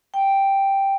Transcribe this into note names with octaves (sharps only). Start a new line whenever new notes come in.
G5